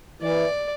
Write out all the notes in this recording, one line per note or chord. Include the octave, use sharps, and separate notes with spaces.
E3 D5